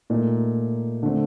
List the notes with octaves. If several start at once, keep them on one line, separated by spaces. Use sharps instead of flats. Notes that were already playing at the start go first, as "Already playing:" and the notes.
A#2 A3 D#4
D3 A3 C4